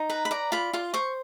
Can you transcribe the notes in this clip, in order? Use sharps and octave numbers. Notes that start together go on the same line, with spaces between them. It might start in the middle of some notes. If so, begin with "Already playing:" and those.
Already playing: D#4
B4 A#5
B5
D5 A#5
F4 B5
F4 C6
C5 C#6